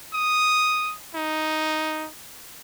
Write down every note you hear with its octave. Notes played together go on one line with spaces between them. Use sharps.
D#6
D#4